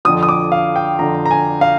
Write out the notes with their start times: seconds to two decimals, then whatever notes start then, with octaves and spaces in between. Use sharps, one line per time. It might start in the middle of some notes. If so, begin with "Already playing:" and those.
0.05 F2 D3 F3 D#6
0.23 D#6
0.29 D6
0.52 F5
0.76 G5
0.99 F2 D3 F3 A#5
1.25 A#5
1.31 G#5
1.61 F5